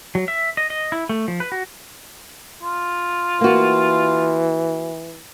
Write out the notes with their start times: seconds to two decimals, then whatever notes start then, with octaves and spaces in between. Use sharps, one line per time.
0.15 F#3
0.28 E5
0.57 D#5
0.70 D#5
0.92 E4
1.09 A3
1.28 F3
1.40 B4
1.52 F#4
2.62 F4
3.41 E3 A#3 F#4